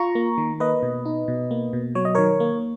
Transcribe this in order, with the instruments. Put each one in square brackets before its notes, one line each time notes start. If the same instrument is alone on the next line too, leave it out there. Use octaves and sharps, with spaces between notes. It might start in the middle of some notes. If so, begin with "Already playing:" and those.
Already playing: [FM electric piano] F4 A#5 C#6
A#3
D#3
A#3 B4 D#5
B2
D#4
B2
A#3
B2
F#3 C#5
D#5
D#3 A#4 C#5
A#3